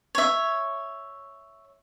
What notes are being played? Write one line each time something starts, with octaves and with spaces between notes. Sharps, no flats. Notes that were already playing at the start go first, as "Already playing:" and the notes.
C#5 E5